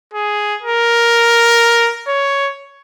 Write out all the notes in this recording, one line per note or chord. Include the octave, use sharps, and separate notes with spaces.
G#4
A#4
C#5